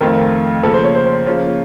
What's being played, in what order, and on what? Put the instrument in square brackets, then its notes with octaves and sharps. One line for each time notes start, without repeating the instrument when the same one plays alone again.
[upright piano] F2 D#3 A3 C4 F4 [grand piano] A#4
[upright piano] C#3 F3 A#3 [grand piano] A4
[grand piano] C5
C#5
C5
[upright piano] C#3 F3 A#3 C#4 F4